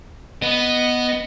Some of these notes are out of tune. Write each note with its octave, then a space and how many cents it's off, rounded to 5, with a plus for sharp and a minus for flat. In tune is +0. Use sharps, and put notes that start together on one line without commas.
B3 +0 D#5 +0